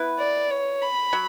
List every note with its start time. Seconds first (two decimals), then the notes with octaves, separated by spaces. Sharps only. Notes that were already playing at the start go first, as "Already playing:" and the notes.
Already playing: B3 E4 B4
0.19 D5
0.51 C#5
0.82 B5
1.13 F#3